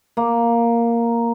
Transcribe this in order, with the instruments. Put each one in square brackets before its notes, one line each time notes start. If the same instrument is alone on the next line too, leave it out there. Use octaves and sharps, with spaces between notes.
[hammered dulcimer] A#3